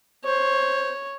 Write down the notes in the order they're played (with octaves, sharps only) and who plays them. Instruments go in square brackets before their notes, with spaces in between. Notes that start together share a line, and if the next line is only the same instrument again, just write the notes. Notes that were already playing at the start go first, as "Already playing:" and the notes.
[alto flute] C5 [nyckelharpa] C#5